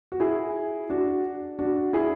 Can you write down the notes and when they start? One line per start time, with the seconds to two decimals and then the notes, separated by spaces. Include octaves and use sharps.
0.12 F#4
0.20 E4 G#4
0.89 D4 F#4
1.59 D4 F#4
1.93 E4 G#4